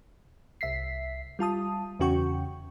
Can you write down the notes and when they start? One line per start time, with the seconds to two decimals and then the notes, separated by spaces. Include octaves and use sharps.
0.61 C2 E5 B6 C7
1.39 G3 F4 A5 D#6
1.99 E2 C#3 C#4 F#4 G5 C#6